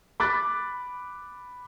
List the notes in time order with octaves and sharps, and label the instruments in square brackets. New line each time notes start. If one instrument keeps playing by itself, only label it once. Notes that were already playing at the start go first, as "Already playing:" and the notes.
[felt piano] B5 D6 F#6 A6